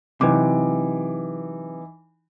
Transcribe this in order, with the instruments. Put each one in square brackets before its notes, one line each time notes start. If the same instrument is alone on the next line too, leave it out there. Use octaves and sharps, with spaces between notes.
[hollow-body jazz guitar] C3 F#3 [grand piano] E3 D#4 D6